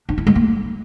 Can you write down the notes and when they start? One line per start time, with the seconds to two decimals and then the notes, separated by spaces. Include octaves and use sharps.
0.09 D4
0.18 E4
0.27 G#3
0.35 A#3